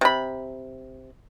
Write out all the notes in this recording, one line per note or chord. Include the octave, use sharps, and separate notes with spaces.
C3 B5